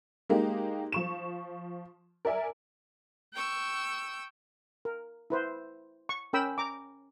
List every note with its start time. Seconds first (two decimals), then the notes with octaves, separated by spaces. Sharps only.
0.29 G#3 A#3 D#4 G4
0.92 F3 C#6 E7
2.25 A#4 D5 E5 G#5
3.33 G5 C#6 E6
4.85 A#4
5.30 E4 B4 C5
6.09 C#6
6.33 C#4 A#4 G5 B5 E6
6.58 A#5 D6